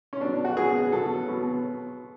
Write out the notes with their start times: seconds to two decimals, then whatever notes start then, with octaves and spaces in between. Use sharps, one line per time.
0.13 C#4
0.20 B2 D4
0.25 F#3
0.33 D4
0.45 F#4
0.56 B2 F#3 G#4
0.92 B2 F#3 A4
1.28 B2 F#3